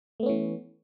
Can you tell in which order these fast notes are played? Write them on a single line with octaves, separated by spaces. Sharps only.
A3 B3 C#4 E3